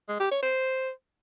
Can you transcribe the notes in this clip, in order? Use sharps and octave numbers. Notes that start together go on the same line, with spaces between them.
G#3
G4
C#5
C5